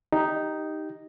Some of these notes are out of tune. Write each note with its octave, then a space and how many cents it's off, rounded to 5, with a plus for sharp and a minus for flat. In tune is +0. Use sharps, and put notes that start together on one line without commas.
D#4 +0 G4 +0